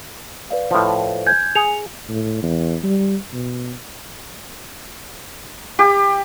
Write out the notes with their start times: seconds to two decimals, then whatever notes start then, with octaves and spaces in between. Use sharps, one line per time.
0.50 B4 D5 F5
0.71 A2 F3
1.26 G#5 G6 G#6
1.55 G#4 G#5 C#7 F7
2.09 A2
2.43 E2
2.83 G3
3.33 B2
5.79 G4